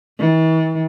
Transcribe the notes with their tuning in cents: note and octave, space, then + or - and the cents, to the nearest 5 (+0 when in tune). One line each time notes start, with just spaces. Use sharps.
E3 -45